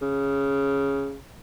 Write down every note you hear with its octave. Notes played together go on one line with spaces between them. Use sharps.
C#3